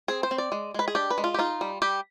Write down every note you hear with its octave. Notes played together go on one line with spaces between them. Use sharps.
C4 G#4
C5
C4
D5
G#3
G#3 B4
G#4
D4 G4
B4
G#3
F4
G4
D#4 F4
G3
G3 G4